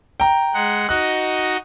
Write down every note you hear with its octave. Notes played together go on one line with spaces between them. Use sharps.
G5 A#5
G#3 F#5
D#4 F#4 D#5 F#6